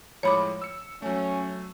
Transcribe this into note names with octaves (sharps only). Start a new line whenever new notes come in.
A2 F3 G#3 C#5 B5 D6
E6 C#7
F#3 A3 C#4